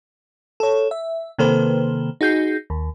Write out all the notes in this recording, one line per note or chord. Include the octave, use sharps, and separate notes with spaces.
A4 C#5
E5
C3 D#3 A#3 A4 B4 C5
D#4 F#4 G#4 G6 A#6 C7
D#2